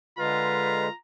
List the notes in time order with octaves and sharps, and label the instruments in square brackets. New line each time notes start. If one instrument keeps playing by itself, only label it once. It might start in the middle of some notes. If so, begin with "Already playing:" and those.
[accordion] D3 G#3 [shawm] F4 [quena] B4 [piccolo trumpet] A#5